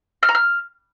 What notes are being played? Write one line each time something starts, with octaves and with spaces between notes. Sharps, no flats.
F6
A#5
F6